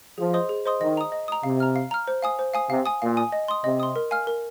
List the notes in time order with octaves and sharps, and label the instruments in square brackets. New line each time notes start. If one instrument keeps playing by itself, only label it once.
[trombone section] F3 [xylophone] G#4
[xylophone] C5 D#5 C6 D#6
G#4
C5 D#5 C6 D#6
[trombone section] D#3 [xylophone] D#5
[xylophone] A#5 D#6
D#5
A#5 D#6
[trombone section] C3 [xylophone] F5
[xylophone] A#5 F6
F5
A#5 F6
C5
F5 G#5 D#6
C5
F5 G#5 D#6
[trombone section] C3 [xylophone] F5
[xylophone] G#5 D#6
[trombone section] A#2 [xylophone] F5
[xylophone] G#5 D#6
D#5
C6 D#6
[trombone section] C3 [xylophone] D#5
[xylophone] C6 D#6
A#4
F5 G#5 F6
A#4